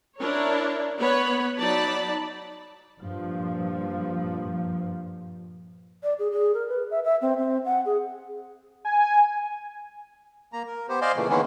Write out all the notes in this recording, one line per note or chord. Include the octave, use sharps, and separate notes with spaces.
D4 E4 A#4 C#5
B3 C#5 B5
F#3 D#4 D5 A5 B5
G2 A#2 F3
D5
G#4
G#4
A#4
B4
E5
E5
C4
C4
F#5
G#4
G#5
A#3 A#5
A#4
B3 G4 C5
C5 D5 D#5 F5 G#5 C6
A#2 C#3 E3 A3
D#3 E3 G#3 A#3 B3 C#4